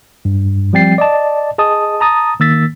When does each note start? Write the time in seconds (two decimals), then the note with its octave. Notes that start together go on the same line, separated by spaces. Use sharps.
0.25 G2
0.73 F3 G3 C4 G5 A6 C7
0.98 D5 D#5 A5
1.58 G#4 D#5 A5 D#6
2.00 A5 A#5 D#6 A6
2.40 D#3 A#3 E6 A6 B6